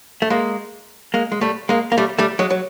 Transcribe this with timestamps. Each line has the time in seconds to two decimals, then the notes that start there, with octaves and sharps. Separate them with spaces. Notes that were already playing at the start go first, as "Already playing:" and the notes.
0.22 A3
0.30 G#3 A#3
1.14 G#3 A#3
1.32 G#3
1.41 G3 A3
1.69 G#3 A#3
1.92 A#3
1.98 G3 A3
2.19 G3 A3
2.39 F#3 G#3
2.50 F#3